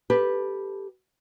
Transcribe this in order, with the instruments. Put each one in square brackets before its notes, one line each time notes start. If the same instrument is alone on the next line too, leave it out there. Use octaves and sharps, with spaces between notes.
[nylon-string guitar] G4 A4 B4